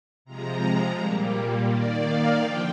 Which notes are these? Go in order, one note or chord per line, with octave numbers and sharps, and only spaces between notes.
C3 F3 G#3 A#5
A#2 G3 A#3
D#3 A#3 D5
F5
D3 F3 G5